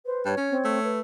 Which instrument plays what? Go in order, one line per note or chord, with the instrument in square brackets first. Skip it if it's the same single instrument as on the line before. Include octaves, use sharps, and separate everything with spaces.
[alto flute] B4 [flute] C5
[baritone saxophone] G2 [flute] C#5
[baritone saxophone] C#4
[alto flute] C4
[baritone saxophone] A3
[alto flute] B4